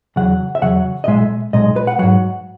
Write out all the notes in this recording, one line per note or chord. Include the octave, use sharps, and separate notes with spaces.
E2 C#3 F#3 F#5
E5
E2 C#3 F#3 F#5
D#5
B1 A#2 G#3 E5
B1 A#2 G#3 D#5
B4
F#5
G#2 F#3 F#5